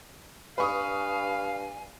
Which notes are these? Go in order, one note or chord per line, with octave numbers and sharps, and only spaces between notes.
G2 B4 F5 G#5 C#6 D#6